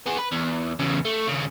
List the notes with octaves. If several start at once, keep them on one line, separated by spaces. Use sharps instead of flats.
B3 G#4
B4
E2
E2 C#3
A3
D#2 C#3